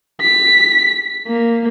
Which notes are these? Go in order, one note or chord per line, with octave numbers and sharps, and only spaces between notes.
B6
A#3